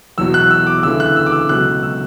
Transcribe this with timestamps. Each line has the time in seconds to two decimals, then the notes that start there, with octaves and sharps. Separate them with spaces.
0.18 E2 B2 F#3 E6
0.34 F#6
0.51 E6
0.67 D6
0.83 D2 C#3 E3 E6
1.00 F#6
1.16 E6
1.26 D6
1.32 E6
1.49 C#2 B2 F#3 F#6
1.83 E6